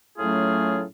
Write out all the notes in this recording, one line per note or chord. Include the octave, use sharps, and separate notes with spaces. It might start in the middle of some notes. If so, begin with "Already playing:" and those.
A2 F#3 A3 C#4 F4 G#4